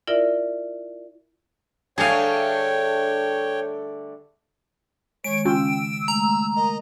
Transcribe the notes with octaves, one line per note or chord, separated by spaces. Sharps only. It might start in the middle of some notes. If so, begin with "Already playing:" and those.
E4 F4 A#4 D5 E5
D3 G3 A3 G#4 C#5 F5 G5
D#3 G#3 C#5 D7
C#3 C#4 F4 G5 E6
G#3 A3 A#5
A#4 D#5